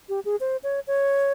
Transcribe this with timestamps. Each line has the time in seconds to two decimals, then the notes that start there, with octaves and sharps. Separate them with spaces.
0.09 G4
0.25 G#4
0.40 C5
0.63 C#5
0.87 C#5